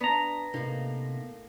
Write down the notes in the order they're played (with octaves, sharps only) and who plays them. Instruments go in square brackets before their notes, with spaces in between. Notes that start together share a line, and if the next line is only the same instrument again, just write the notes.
[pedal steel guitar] B3 A#5 [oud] D4
[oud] A2 A#3 [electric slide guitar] C3 D#4